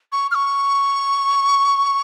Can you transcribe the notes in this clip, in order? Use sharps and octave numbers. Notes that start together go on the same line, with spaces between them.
C#6
F6
C#6